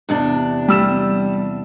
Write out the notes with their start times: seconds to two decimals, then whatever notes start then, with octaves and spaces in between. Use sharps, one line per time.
0.09 E2 C3 D4
0.68 G3 E6 E7